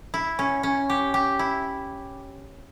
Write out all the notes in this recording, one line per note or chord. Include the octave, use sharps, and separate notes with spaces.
E4
C#4
C#4
G4
G4
E4